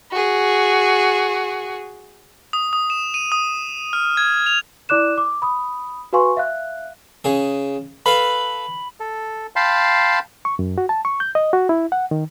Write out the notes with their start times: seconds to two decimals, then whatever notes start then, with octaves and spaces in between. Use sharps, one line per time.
0.12 F#4 G#4
2.53 D#6
2.73 D#6
2.90 E7
3.14 D#7
3.32 D#6
3.93 F6
4.17 G#6
4.46 F7
4.89 E4 D5 D6 F#6 E7
5.18 D6
5.42 B5 D#6
6.13 F#4 B4 F5 G#5 C6 C#6
6.37 E5 F5 F#6
7.24 C#3 G#4
8.06 A4 B4 F5 B5
9.00 A4
9.56 F5 G5 A5 B5 C6
10.45 C#6
10.59 F#2
10.78 F#4
10.89 A5
11.05 C#6
11.20 G6
11.35 D#5
11.53 F#4
11.69 E4
11.92 F#5
12.11 D#3